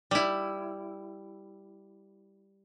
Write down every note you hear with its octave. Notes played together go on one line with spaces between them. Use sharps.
G3 E4